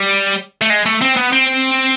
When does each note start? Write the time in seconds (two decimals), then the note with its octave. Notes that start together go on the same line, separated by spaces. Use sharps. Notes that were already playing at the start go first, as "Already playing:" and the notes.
Already playing: G3
0.62 A3
0.70 G#3
0.86 A3
1.01 C4
1.17 B3
1.32 C4